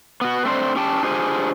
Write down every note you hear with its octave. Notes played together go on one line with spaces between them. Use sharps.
B3 F#4
A3 C4 D4 C5
C#4 G4 G5 A5
D4 F4 G4 G#4 C5 G#5